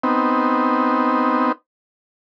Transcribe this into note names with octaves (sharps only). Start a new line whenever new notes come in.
B3 C4 D#4